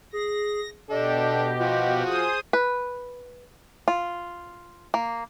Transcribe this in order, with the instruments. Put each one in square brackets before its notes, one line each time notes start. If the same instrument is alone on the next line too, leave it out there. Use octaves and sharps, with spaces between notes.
[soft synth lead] G#4 [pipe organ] A#6
[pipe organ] B2 G4 [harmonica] D4 A4 [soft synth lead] D#5
[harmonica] F3 F4 F#4
[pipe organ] G#4 C5 D#6
[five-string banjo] B4
F4
A#3